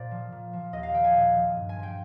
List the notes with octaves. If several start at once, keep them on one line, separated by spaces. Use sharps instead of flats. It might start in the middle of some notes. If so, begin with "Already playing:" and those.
Already playing: A#2 C5 D5
F3
A#2
F3
D#2 D#5
F5
D#3 G5
G#5
A#2
F3
G2
G#5
F3
G5